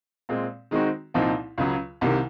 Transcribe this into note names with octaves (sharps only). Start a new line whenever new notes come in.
A#2 G#3 C4
D#3 G#3 C4 D#4 F#4
C2 A#2 F3 C4 D#4
C#2 C#3 F#3
C2 C3 D#3 A#3